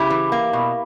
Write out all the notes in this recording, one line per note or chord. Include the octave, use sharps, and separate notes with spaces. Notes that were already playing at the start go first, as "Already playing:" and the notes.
Already playing: C#3 E4 G4
E3
A#3
B2